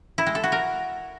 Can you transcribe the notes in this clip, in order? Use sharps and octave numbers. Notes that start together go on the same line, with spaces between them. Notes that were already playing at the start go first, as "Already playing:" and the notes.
E4
G#3
A4
F#4
A#4